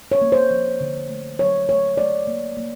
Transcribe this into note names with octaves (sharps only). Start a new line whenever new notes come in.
C#5
A#3
C5
F3
D3
A3
F#3 C#5
A3 C#5
A3 D5
A#3
A#3